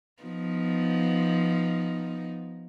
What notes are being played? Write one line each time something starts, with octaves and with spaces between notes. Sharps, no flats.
F3 B3 D#4